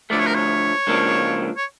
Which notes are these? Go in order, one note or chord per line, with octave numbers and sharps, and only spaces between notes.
D2 D3 F3 A3 D5
C#5
A#4
C#5
C#2 C#3 F3 A#3 D4
C#5